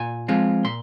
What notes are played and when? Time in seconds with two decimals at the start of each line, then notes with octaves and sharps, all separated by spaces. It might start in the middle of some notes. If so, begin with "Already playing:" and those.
Already playing: A#2 G#5
0.28 F3 G#3 C4 F4
0.64 A#2 C6